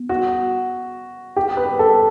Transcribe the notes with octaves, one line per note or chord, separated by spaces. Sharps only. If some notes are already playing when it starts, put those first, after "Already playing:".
Already playing: B3
F#4
G4
B4
A4